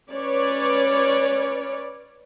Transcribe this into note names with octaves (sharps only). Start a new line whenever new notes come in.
C#4 B4 C#5 D5